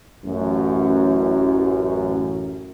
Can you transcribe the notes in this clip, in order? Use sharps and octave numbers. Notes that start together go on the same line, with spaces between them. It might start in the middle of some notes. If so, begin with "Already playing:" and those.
A1 F#2